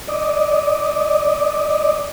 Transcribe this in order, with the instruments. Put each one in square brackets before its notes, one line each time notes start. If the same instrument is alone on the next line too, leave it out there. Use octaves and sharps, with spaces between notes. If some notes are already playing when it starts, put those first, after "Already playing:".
[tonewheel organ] D5 D#5